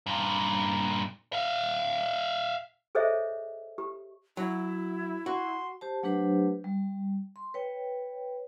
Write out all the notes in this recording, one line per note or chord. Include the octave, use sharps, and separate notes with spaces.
G2 A#2
E5 F5
G#4 A4 C5 C#5 D#5 E5
G4
F#3 E4
F#4 C6
G4 C5 A5
F#3 A3 D4 G4 B4 C5
G3
C6
B4 C#5 G5